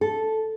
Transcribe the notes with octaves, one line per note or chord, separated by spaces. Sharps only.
A4